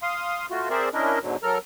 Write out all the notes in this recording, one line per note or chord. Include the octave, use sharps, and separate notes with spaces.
F5 C6 D#6
A3 F4 F#4
C4 G#4 A#4 C5 D5 E5
C#4 D4 E4 A#4 D#5
G#2 B2 D3 F#3
F#3 A4 A#4 A#5 F6